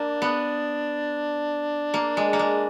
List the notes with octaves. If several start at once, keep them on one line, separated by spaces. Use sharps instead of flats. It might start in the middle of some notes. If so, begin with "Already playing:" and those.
Already playing: A#3 D4
B3
A#3
G#3
A#3
G#3